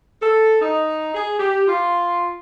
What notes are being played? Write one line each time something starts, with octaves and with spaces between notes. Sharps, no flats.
A4
D#4
G#4
G4
F4